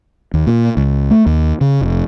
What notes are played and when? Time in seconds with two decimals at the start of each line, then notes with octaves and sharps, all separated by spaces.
0.34 D#2
0.47 A#2
0.77 C#2
1.11 A3
1.26 D#2
1.61 C#3
1.81 F1